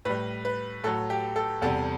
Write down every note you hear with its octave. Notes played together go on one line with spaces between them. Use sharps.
A2 G3 B4
B4
A2 F#3 A4
G4
A4
E2 C3 G3 A4